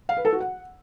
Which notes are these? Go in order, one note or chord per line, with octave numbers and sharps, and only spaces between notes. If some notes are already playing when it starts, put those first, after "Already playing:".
F5
B4
A4
F#4
F#5